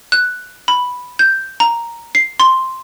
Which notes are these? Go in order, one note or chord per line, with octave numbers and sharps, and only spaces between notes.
F#6
B5
G6
A#5
C7
C6